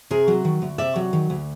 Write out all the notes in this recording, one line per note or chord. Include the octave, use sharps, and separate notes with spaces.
C3 G#4 A#4
F#3
D#3
D2
C3 D5 E5
F#3
D#3
D2